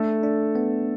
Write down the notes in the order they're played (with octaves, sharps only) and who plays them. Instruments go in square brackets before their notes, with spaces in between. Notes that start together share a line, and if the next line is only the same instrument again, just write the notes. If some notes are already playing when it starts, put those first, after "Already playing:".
Already playing: [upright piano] A3 A4 [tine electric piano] D4
[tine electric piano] D4
B3